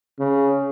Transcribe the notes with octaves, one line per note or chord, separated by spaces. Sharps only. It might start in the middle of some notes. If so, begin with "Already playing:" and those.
C#3